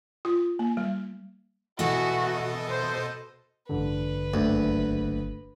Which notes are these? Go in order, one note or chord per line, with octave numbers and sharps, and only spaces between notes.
F4
A#3
G3
B2 E3 E4 F#4 A4 D#5
C5
A1 G2 D3 B4
F#1 D2